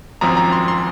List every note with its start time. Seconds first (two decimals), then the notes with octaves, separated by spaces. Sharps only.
0.21 G#1 F#2 F3 C4 A#5
0.37 A#5
0.52 C6
0.68 C6